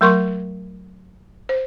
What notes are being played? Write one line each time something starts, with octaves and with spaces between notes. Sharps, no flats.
F#3 A3 A#4 C6 C#6
C5